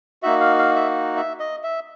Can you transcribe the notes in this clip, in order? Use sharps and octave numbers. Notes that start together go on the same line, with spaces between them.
A#3 D#4 F#4 E5
F5
F5
E5
E5
D#5
E5